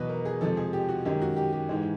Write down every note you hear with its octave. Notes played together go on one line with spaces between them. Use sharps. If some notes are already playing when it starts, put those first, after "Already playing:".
Already playing: E2 B2 F#3 B4 D#5
A#4
G#4
F2 C3 F3 G#3 A4
G#4
G4
F#4
F#2 D#3 G#3 G4
F#4
G4
G4
G#2 E3 G#3